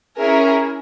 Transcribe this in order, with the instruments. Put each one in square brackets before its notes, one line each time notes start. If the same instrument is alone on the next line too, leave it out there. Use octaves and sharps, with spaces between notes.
[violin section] C#4 E4 G#4 A#4